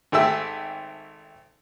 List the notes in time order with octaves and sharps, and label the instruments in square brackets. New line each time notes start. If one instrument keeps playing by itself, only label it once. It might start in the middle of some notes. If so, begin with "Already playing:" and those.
[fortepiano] G#1 A3 G4 G#4 E5 E6